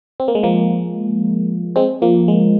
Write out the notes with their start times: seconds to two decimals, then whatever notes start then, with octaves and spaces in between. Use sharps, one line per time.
0.20 C4
0.28 A#3
0.35 G#3
0.43 F3 A#3
1.76 G#3 C4
2.02 F3 A#3
2.28 G#3